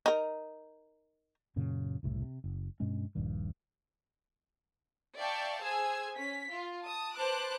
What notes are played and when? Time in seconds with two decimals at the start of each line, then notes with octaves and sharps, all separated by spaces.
0.06 D#4 A#4
1.56 F#2 A#2 C#3 F#3
2.03 F#1 C2 A2
2.22 C3
2.44 F#1
2.80 G2 B2 G#3 C#4
3.15 D#1 A#1 G2 D#3
5.17 D5 E5 F5 G5 A5 C#6
5.63 G#4 C5 G#5 E6
6.16 C#4 B6
6.51 F4
6.84 A5 D#6
7.16 B4 C5 A5 D6 F#6